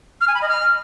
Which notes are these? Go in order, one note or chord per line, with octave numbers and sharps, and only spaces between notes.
F6
G#5
B5
D#5
F6